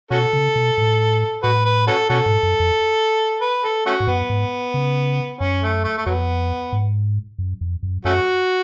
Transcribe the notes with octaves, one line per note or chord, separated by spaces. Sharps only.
B2 C#4 F#4 A4
C#3
B2
A2
A2 F#4 B4
B4
C#4 F#4 A4
B2 C#4 F#4 A4
G#2
F#2
F2
B4
A4
A3 C#4 F#4
G#2
F#2 B3
G#2
C#3
F#2 C#4
A3
A3
A3
F2 F#3 B3
G#2
F#2
F2
F#2
F#2 A3 C#4 F#4